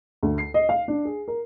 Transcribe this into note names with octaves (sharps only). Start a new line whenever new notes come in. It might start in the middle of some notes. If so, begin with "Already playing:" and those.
D2
C7
D#5
F5
D4
G#4
A#4